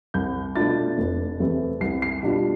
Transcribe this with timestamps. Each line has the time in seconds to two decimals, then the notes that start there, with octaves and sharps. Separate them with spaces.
0.14 C2 G6
0.55 B2 A3 D4 F4 A6
0.98 F1
1.40 E2 C3 E3 A3
1.80 C2 C7
2.02 C7
2.23 B2 G3 D4 F4